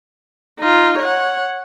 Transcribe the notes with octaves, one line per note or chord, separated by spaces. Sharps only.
D#4 F4
C#5 F#5